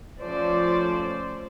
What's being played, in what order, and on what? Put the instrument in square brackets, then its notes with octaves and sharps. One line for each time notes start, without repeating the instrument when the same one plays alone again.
[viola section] F3 A3 C#4 C5 D5